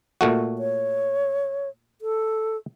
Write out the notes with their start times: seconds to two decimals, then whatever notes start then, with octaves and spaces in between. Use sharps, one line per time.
0.21 A#2 A3 F#4
0.58 C#5
2.01 A4